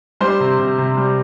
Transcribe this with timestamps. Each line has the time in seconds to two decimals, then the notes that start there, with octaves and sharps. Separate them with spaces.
0.21 G3 C5 C6
0.40 C3
0.59 C3
0.78 C3
0.97 G3